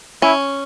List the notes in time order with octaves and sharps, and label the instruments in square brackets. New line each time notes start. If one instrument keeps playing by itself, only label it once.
[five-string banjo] C#4 [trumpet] E4